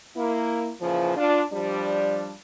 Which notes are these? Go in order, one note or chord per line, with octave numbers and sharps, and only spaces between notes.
A#3 E4
A#2 C#3 E3 F3
D4 F4
F3 G3 D4